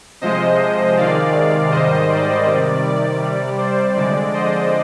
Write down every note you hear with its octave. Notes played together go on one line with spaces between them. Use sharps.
C3 F3 G#3 C5 D#5
C3 D#3 G#3 D5 F5
G#2 D#3 G3 C5 D#5
D5
C3 D#3 G3
D5
C3 G3
C5
F2 D3 G#3 D5
C5 D#5